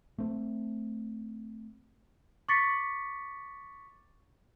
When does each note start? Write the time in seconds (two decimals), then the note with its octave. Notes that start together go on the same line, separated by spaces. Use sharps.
0.18 A3 C4
2.49 C#6 D6 A6 B6 C#7